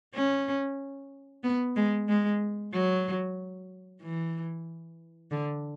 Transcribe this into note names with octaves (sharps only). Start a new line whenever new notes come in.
C#4
B3
G#3
G#3
F#3
E3
D3